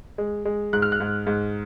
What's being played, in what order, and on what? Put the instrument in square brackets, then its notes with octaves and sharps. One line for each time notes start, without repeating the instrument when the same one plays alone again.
[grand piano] G#3
G#3
G#2 F#6
F6
F#6
G#2
G#2